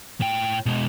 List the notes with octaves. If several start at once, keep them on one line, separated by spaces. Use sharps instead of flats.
A2 G5
B2 G#3